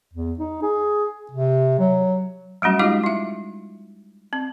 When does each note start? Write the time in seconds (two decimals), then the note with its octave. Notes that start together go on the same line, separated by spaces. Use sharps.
0.13 E2
0.39 D#4
0.62 G#4
1.31 C3
1.79 F#3
2.62 F#3 G3 A3 C#4 F#4
2.79 G#3 D#4 F4 G4 D#5 D6
3.04 E4 E5
4.33 C4